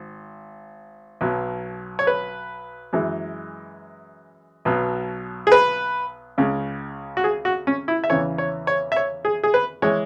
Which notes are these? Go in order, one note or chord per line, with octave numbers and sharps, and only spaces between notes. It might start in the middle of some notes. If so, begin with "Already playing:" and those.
Already playing: G#1
B1 B2 F#3
C#5
B4
F#2 E3 G#3
B1 B2 F#3
G#4
B4
C#2 C#3 G#3
F#4
G#4
F#4
C#4
E4
E5
E2 C#3 E3 C#5
C#5
C#5
E5
C#5
G#4
G#4
B4
E3 G#3 C#5